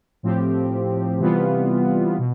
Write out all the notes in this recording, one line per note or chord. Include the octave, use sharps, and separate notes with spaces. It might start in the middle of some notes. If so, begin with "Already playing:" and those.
A2 F3 C4 G4
C3 E3 G3 B3 F4
B2